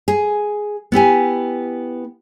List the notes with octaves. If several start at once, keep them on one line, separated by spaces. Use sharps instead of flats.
G#4
B3 E4 G4 G#5